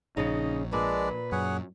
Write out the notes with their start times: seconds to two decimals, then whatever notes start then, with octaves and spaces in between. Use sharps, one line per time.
0.17 A#1 C#3 C#4 D#4
0.73 A#2 G#3 D4 B4 D5
1.32 F#2 G#4 C#5 F#5